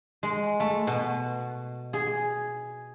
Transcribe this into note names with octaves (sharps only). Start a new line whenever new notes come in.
G#3
A3
B2
G#4